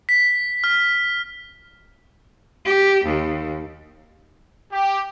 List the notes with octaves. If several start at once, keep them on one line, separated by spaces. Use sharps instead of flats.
B6
F6
G4
D#2
G4